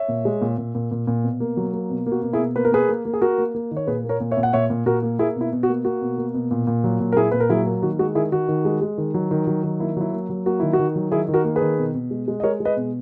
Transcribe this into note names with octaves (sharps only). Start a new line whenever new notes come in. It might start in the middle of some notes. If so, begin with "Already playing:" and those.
Already playing: C#5 E5
A#2
G#3
A#2
A#2
A#2
A#2
A#2
B2
A#3
F#3
A#3
B2
A#3
F#4
B2
E4 G#4
B2
A#3 B4
A#4
A#3 G#4 B4
A#3
A#3
G#4
A#3 F#4 A#4
A#3
A#3
D#3
C#5
A#2 G#4 B4
A#3
A#4 C#5
A#2
C#5 E5
A#2
F#5
A#2 C#5 E5
A#2
A#2 F#4 A#4
A#3
A#3 E4 G#4
B2
E4
B2
F#4
A#3
A#3 F#4
B2
A#3
B2
A#2
A#2
F#3
A#2
A#4
A#2 E4 G#4
A#2 B4
A#4
F#3 E4 G#4
A#3
D#3 F#4
G#3 F#4
D#3 E4 G#4
D#3 F#4
D#3
G#3
G#3
D#3
F#3
D#3
F#3
D#3
A#3 E4
F#3 E4
A#3
F#3
A#3 F#4
D#3 E4
F#4
D#3
F#3
D#3 E4 G#4
D#3
F#4 A#4
A#3
G#4 B4
D#3
B2
B2
G#3
G#3
D#5
G#3 A#4 C#5
G#3
B4 D#5
B2